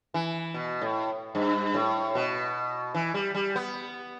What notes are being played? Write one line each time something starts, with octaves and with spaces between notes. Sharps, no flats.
E3
B2
A2
G2
A2
B2
E3
G3
G3
B3